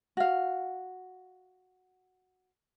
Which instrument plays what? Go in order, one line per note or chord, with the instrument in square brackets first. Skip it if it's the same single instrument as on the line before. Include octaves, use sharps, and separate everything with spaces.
[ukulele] F#4 F5